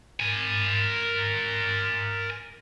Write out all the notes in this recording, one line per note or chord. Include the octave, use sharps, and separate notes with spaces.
A#4 G#5